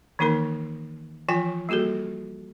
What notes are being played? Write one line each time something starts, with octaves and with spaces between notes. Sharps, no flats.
D#3 E3 A#3 D#4 A#4 B5
E3 F3 F4 G5 G#5
G3 A#3 F#4 G#4 A4